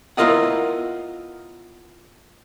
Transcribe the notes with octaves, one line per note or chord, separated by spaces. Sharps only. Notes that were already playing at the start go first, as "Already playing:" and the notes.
B3 E4 F4 A#4 D#5 F#5